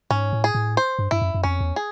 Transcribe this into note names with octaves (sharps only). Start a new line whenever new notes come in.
G#2 C#4
A2
G#4
A2
C5
G2
G2 E4
F#2
F#2
F2 C#4
E2
G#4